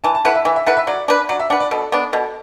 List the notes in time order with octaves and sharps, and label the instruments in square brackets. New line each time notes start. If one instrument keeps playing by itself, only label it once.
[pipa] E3 [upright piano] A5
[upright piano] A5
[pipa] A3 E4 B4 [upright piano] F#5
[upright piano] E5
[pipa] E3 [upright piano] E5
[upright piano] E5
[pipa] A3 E4 B4 [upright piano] F#5
[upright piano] E5
[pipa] F#3 [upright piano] D5
[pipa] D4 B4
[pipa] F#3 [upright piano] D5
[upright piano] E5
[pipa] D4 B4 [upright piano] F#5
[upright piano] D5
[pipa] B2 [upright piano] A4
[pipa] B3 D4
[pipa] B2 [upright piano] A4